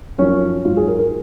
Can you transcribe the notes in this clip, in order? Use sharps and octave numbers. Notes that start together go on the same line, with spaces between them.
F#2 F3 C#4
G#2 F#3 F4
G#4
A#4
A#4